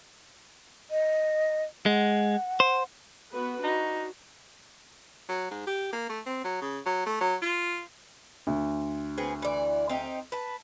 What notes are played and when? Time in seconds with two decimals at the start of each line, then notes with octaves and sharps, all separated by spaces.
0.91 D#5
1.86 G#3 F#5
2.60 C5
3.31 B3 F#4 B4
3.64 D4 D#4 F#4
5.29 F#3
5.50 G#2
5.67 G4
5.92 A#3
6.09 A3
6.26 C4
6.44 F#3
6.61 C#3
6.86 F#3
7.06 A3
7.21 F#3
7.42 F4
8.47 D2
9.18 B3 C4 G#4
9.42 E3 D5
9.89 C4 D#4 G4
10.32 B4 A5